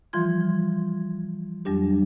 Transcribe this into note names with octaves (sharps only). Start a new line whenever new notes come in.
E3 F3 G3 F4 C6 G#6
F2 F#3 G3 D4 G4